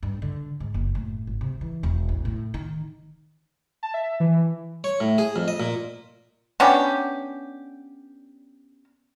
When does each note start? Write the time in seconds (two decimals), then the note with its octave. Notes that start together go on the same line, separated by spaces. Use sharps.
0.03 G2
0.22 D3
0.60 G#2
0.74 F#1
0.95 A2
1.27 G#1
1.41 C3
1.61 E3
1.83 E1
2.09 A1
2.25 A2
2.54 D#3
3.83 A5
3.94 E5
4.20 E3
4.84 C#5
5.00 A2
5.18 G#4
5.36 F2
5.48 D#5
5.60 A#2
6.60 B3 C#4 D4 G4